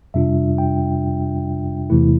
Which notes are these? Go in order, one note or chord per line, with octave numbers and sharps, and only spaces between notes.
F2 C3 G3 D4 F4 E5
G5
E2 C3 E3 A3 E4